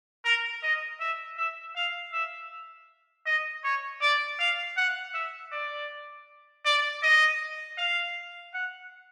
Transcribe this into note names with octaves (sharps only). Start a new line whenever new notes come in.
A#4
D#5
E5
E5
F5
E5
D#5
C#5
D5
F5
F#5
E5
D5
D5
D#5
F5
F#5